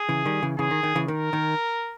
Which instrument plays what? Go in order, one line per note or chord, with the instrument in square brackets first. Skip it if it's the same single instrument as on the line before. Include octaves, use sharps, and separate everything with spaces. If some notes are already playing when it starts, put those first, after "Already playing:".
Already playing: [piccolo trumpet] G#4
[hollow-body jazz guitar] C#3 E3
D#3 G3
C#3 E3
[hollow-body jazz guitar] C#3 E3 [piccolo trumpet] G#4
[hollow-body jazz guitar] D#3
D#3
C#3 E3
[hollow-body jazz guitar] D#3 [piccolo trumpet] A#4
[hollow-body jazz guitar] D#3